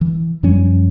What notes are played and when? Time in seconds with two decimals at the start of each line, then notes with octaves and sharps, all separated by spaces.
0.01 E3
0.43 F#2 F3 G3 C#4